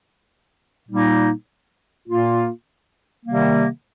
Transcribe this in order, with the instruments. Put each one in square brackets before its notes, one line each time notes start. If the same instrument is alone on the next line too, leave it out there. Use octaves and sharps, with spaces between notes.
[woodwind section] A#2 G3 A#3 D#4
A#2 A#3 F4
C3 D#3 G3 A#3